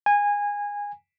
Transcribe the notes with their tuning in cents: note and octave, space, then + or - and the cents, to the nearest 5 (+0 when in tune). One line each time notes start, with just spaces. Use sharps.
G#5 -20